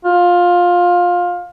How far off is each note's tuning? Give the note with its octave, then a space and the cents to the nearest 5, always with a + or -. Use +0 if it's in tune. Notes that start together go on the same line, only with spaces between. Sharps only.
F4 +15